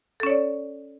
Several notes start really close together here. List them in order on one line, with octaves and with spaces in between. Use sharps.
A4 C#4 C#5 D5